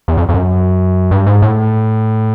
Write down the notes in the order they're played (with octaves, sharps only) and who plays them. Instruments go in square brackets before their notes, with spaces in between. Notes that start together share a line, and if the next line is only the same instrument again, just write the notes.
[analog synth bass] E2
F2
F2
F#2
G2
G#2
A2